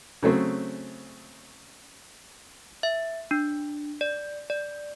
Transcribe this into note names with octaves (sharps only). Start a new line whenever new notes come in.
C#3 F#3 A3 C4
E5
D4
D5
D5